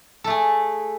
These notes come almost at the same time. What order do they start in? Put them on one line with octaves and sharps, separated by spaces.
A4 A3 G#4